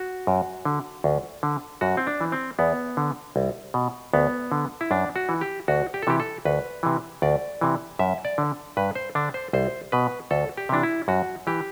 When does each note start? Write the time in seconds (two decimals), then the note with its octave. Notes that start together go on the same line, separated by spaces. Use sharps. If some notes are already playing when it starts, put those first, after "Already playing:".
Already playing: F#4
0.27 F#2
0.65 D3
1.04 D2
1.43 D3
1.81 F#2 F#4
1.97 C4
2.07 D4
2.21 E3
2.32 C4
2.59 E2 B3
2.97 D3
3.36 C2
3.74 B2
4.13 D2 B3
4.52 D3
4.81 E4
4.91 F#2 D4
5.16 F#4
5.29 E3
5.41 G4
5.68 D2 F#4
5.94 G4
6.03 A4
6.07 C3 E3 G4
6.20 A4
6.45 D2 B4
6.83 C3 E3
7.22 D2 D5
7.61 C3 E3
7.99 F#2 E5
8.25 D5
8.38 D3
8.77 G2 B4
8.95 C5
9.15 D3 D4
9.34 C5
9.53 C2 C5
9.92 B2 B4
10.31 D2 A4
10.57 G4
10.69 C3 E3 D4
10.83 E4
11.08 F#2 F#4
11.47 E3 G4